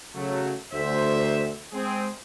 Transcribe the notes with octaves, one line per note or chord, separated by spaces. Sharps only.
C#3 F#3 A3
D2 C5 E5
G#3 C4 G#4